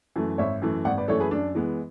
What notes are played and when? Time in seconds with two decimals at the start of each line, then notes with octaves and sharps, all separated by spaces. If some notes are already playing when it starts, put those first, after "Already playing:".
0.16 F#2 E3 A3
0.38 G#1 C#5 E5
0.62 F#2 E3 A3
0.85 G#1 D5 F#5
0.97 B4 D5
1.08 F#2 E3 A3 A4 C#5
1.20 G#4 B4
1.31 F#2 D4
1.55 E3 G#3 B3